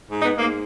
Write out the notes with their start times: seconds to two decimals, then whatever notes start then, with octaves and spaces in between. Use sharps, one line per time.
0.11 G#2
0.22 B3 D#4
0.33 G#2
0.39 A#3